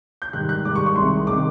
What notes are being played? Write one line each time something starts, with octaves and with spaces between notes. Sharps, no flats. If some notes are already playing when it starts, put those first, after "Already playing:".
G6
G#2 D#3 G3 F#6
F#6
G#2 D#3 G3 D6
C#6
C#6
C2 C3 D#3 G#3 C6
C3 D#3 G#3 D6